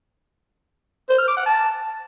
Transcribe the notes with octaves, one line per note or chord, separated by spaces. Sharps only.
C5
F6
D6
F#5
A5